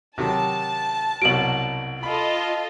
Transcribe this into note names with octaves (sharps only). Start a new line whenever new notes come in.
C3 D#3 F#3 A5
C2 B2 F#3 D7 F#7
F4 A4 D#5 B5